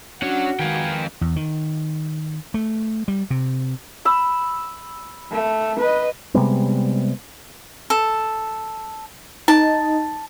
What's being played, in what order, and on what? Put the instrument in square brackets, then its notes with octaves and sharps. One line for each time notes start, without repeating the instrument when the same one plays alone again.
[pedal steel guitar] C#4 D4 [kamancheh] F#4 [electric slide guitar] C#5 F#5
[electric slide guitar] F2 F5 G5 [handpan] D#3 G#3 [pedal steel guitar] A#4 B4 G#5
[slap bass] E2
D#3
A3
G3
C3
[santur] B5 E6
[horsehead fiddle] A3
B4 D#5
[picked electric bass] C3 G3 G#3 B3
[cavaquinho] A4
[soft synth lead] D#4 [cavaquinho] A5